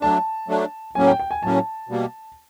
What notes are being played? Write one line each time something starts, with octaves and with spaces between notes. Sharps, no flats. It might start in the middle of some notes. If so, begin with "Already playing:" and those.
F#3 A3 D4 A5
F#3 A3 D4
A2 F#3 A#3 C#4 G#5
G5
G5
G#5
A2 F#3 A#3 C#4 A5
B2 G3 A#3